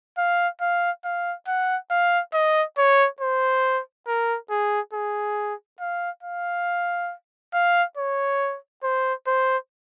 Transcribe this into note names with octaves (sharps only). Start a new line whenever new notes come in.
F5
F5
F5
F#5
F5
D#5
C#5
C5
A#4
G#4
G#4
F5
F5
F5
C#5
C5
C5